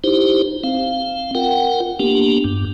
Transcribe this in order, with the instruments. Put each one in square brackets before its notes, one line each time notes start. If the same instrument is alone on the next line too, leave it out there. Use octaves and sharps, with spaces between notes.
[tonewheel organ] D#4 E4 G4 C5
C4 F5
F4 A#4 F#5 G5
A#3 B3 D4 G4
G2